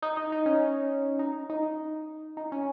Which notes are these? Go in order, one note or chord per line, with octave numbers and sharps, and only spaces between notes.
D#4
D#4
D#4
C#4
D#4
D#4
D#4
C#4